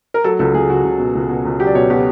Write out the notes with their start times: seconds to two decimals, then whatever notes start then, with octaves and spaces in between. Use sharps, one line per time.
0.14 A#4
0.24 F#3 A4
0.39 C#2 A4
0.54 C#2 G#4
0.70 C#2 F#4
0.85 C#2
0.99 B2
1.15 C#2
1.29 B2
1.45 C#2
1.60 F#3 G4
1.67 D5
1.75 B2 C#5
1.90 B2 G4